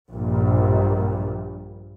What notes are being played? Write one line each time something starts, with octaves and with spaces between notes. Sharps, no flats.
A#1 G2 A#2